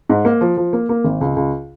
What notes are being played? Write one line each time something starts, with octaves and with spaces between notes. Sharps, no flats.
G#2
A#3
F3
F3
A#3
A#3
G#1
C#2
C#2